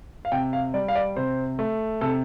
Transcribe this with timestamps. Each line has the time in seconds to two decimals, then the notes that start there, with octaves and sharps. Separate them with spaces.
0.25 F5
0.32 C3 G5
0.53 F5
0.74 G3 D5
0.88 F5
0.95 D5
1.16 C3 C5
1.59 A3
2.01 C3 A4